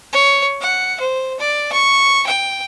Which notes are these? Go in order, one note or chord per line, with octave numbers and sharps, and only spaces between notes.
C#5
F#5
C5
D5
C#6
G5